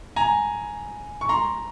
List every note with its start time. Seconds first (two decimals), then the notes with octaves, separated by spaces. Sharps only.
0.16 G#5 A#5
1.21 C#6
1.29 A#5 C6